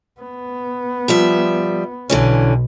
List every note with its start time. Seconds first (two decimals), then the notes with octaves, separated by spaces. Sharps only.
0.20 B3
1.08 F3 G3 E5
2.10 B1 D3 E3 C#4